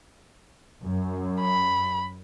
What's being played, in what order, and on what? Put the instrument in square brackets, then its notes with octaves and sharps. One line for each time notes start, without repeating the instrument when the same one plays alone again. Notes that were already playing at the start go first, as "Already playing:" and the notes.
[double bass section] F#2
[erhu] B5